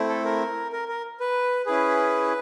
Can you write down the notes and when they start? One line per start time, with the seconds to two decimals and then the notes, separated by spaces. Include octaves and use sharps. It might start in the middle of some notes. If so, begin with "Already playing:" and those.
Already playing: A3 C4 E4
0.09 A4
0.25 A#4
0.73 A#4
0.88 A#4
1.20 B4
1.66 C#4 E4 G#4 B4